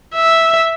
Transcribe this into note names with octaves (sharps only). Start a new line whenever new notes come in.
E5